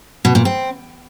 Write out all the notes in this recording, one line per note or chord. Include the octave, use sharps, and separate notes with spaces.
B2
A#2
C4